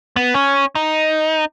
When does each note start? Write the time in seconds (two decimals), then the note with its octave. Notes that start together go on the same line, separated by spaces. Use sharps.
0.16 B3
0.34 C#4
0.75 D#4